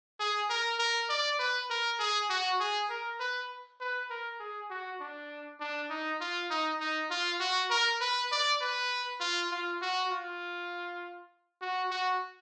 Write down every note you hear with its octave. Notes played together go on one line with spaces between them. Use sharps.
G#4
A#4
A#4
D5
B4
A#4
G#4
F#4
G#4
A#4
B4
B4
A#4
G#4
F#4
D4
D4
D#4
F4
D#4
D#4
F4
F#4
A#4
B4
D5
B4
F4
F4
F#4
F4
F#4
F#4